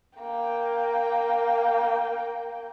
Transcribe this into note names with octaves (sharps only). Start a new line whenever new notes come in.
A#3 G5